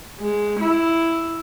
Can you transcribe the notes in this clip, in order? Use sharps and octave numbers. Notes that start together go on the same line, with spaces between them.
G#3
E4